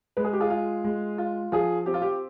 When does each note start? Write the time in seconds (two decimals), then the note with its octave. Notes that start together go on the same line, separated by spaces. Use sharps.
0.17 G#3 B4
0.24 G#4
0.33 G4
0.40 F4 G#4
0.50 F4
0.84 G#3
1.18 F4
1.52 F3 F4 G#4
1.86 C4 G4
1.94 F4
2.02 G4